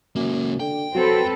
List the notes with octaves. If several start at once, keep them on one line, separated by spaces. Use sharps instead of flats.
C#2 F#2 A#3
D3 G5
F#3 C4 A4 B4